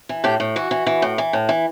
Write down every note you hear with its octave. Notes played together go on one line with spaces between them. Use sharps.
E3
A2 G4
A2
E3 F#4
E3
E3
A2
E3
A2
E3